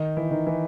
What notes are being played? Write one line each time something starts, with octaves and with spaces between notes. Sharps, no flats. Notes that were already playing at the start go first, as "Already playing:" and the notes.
Already playing: D#3 D#4
E3 E4
D#3 D#4
E3 E4